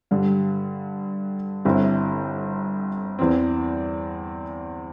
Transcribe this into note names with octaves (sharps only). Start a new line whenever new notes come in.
G2 D3 G3
G1 G2 D3 C4 E4
E2 E3 C4